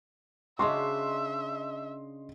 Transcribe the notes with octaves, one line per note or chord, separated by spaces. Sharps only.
C#3 D4 F#4 D#5 E5 C6